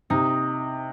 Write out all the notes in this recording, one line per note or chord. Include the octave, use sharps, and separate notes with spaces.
C3 D#4